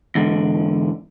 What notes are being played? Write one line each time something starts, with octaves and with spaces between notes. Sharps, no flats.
E2 G#2 D3